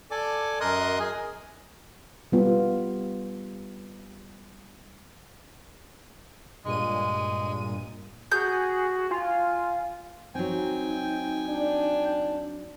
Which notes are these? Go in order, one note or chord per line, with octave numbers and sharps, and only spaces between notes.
A4 D5 G#5 D6
F#2 A#4 D#5 C6 D#6 F#6
G#4 G#5
G3 B3 F4
G2 A#2 G#3 D#7
F#4 G#4 G6
F4 G#5
F#3 C4 D#4 G5 G#5
D4